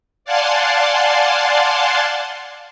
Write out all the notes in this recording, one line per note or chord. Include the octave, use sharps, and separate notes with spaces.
D5 F5 F#5 G#5 A5 C6